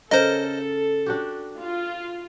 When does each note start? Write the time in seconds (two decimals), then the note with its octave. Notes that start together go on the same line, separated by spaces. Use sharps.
0.11 C#3 A4 A#4 C5 D#5
1.06 D4 F#4 G4
1.58 F4